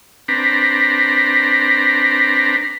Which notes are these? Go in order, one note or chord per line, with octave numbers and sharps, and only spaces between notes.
C4 D4 B4 A#5